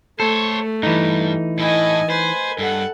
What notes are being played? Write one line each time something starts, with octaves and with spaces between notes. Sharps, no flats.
A3 A4 C5 C#5
G2 E3 D#4
A2 E4 D#5 G#5
B4 C5 G#5
G2 A4 F#5